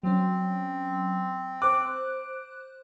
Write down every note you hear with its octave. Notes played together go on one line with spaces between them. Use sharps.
F#3 C4 C#4
C5 D6 F#6